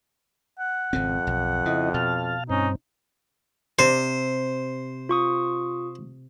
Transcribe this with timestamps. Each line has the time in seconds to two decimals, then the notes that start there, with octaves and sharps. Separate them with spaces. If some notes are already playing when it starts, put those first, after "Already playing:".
0.59 F#5
0.93 G#1 F2 C#3 C4
1.27 B1
1.66 C#3 E4 D#5
1.94 B2 F5 A5 F6
2.50 G2 C4 C#4 D#4
3.79 C3 C5
5.09 F4 C#6 D#6